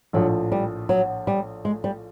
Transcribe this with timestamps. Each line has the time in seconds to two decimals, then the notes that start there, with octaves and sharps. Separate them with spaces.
0.13 A#1 A2 F3 F#3
0.52 G3
0.89 F#3
1.27 G3
1.65 G#3
1.84 G3